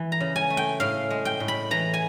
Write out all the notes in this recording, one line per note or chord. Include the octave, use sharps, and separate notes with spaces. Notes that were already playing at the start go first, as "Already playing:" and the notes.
Already playing: E3
A#5
C#3
G#5
A3
G5
A2 F5
G#3
G5
A2
B5
E3 A#5
G#5